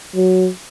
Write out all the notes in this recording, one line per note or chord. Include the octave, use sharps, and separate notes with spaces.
F#3